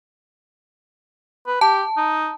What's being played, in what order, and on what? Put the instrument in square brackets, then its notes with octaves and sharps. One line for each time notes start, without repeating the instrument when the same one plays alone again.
[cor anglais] B4
[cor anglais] G4 [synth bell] A5
[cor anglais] D#4